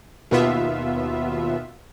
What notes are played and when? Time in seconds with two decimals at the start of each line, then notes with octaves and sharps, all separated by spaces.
0.31 D#2 B2 B3 F4 E5